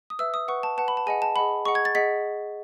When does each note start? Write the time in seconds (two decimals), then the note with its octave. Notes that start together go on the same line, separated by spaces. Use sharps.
0.10 D#6
0.19 B4 E5 E6
0.34 D#6
0.48 B4 F#5 C#6
0.63 A5
0.78 B4 F#5 A5
0.88 B5
0.97 A5
1.06 G#4 D#5 F#5 G#5
1.22 A5
1.36 G#4 D#5 F#5 B5
1.65 G#4 D#5 F#5 C#6
1.75 G#6
1.85 A6
1.95 G#4 D#5 F#5 B6